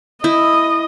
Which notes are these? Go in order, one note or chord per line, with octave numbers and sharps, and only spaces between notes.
E4 D#5